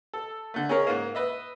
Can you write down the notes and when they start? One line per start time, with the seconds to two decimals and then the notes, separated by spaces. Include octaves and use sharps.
0.14 A4
0.54 D3 A3
0.69 C#4 G#4 A#4 C#5
0.87 G#2 A#3
1.15 B4 D#5 E5